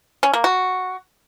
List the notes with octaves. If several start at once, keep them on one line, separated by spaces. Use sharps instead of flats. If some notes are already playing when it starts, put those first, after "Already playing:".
C#4
A#3
F#4